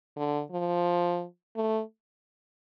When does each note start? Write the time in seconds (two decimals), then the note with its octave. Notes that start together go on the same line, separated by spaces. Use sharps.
0.16 D3
0.51 F3
1.56 A3